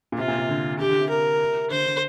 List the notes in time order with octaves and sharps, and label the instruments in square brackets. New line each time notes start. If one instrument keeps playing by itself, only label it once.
[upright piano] A#2
[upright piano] C3 [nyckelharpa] F4
[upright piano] A#2
C3
D3
[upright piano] D3 [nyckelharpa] G4
[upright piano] D3
C3
[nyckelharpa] A#4
[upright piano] D3 [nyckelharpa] C5
[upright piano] D3